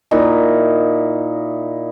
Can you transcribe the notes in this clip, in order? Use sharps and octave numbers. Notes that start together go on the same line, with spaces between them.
A#2 D#4 E4